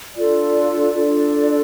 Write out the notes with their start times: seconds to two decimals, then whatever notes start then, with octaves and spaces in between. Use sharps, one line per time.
0.15 D4 F4 A4 D5
0.94 D4 F4 A4 D5